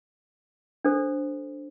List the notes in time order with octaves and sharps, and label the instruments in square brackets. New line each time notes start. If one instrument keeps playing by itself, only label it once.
[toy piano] D4 A4 C5